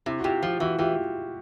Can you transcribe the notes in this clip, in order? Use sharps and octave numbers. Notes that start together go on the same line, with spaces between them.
C3 E4
F#4
C3 F4 G4
F3 F4
E3 E4 F#4
E3 F4 G4